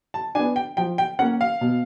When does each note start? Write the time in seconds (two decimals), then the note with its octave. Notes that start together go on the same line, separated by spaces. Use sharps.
0.14 A5
0.35 B3 D4 G#5
0.56 G5
0.77 F3 G5
0.98 G5
1.19 A#3 C#4 F#5
1.41 F5
1.61 B2